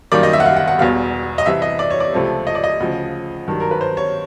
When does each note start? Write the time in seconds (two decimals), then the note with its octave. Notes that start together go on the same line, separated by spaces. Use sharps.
0.12 F#2 D#3 G3 A#3 D5
0.23 D#5
0.33 E5
0.40 F#5
0.46 F5
0.57 F#5
0.68 F#5
0.78 E1 E2 B2 G3 F5
1.38 D#5
1.45 C2 C3 E3 E5
1.62 D#5
1.79 D5
1.90 C#5
2.00 D5
2.12 C#2 C3 F3 A3 C4
2.47 D#5
2.55 D5
2.64 D#5
2.80 D2 C#3 F3
3.48 G2 D#3 F#3
3.60 A#4
3.71 B4
3.81 C5
3.97 C#5